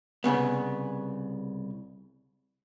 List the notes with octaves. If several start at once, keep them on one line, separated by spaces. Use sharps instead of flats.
C2 G2 C#3 B3